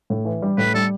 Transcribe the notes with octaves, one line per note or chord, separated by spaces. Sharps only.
A2
E3
G3
A2 B4
G3 A4